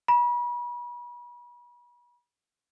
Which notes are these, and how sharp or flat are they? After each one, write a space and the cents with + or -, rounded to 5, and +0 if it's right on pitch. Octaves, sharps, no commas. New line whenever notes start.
B5 -35